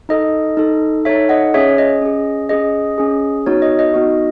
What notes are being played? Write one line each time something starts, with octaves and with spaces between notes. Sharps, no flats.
D#4 A4 D#5
D#4 A4
D#4 A4 C#5 E5
D#5 F#5
C#4 G#4 C#5 E5
D#5
C#4 G#4
C#4 G#4 D#5
C#4 G#4
B3 D#4 F#4 C#5
D#5
D#5
B3 D#4 F#4